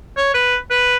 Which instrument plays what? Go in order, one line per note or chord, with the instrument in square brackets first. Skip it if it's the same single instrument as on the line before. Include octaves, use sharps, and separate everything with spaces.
[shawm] C#5
B4
B4